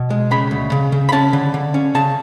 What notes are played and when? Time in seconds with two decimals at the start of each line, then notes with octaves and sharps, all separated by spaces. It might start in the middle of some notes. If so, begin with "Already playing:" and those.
Already playing: B2
0.10 G#3
0.31 C#3 B5
0.51 D2
0.72 C#3
0.92 C#3
1.09 B5
1.12 C#4 A5
1.33 D3
1.54 D3
1.74 C#4
1.95 C#3 A5